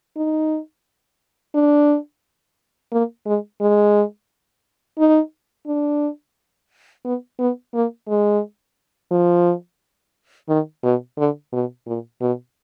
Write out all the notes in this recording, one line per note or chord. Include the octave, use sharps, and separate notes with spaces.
D#4
D4
A#3
G#3
G#3
D#4
D4
B3
B3
A#3
G#3
F3
D#3
B2
D3
B2
A#2
B2